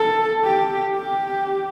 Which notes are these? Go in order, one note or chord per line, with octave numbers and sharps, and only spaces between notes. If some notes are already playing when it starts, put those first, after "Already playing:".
Already playing: A4
G4
G4